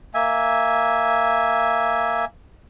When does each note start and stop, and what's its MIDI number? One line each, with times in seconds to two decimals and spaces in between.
0.14 2.25 58
0.14 2.25 76
0.14 2.25 80